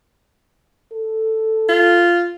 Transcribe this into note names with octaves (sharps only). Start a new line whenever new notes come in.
A4
F4